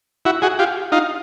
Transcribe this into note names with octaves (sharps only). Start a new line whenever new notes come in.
E4 F#4
F#4 G#4
F4 G4
D#4 F4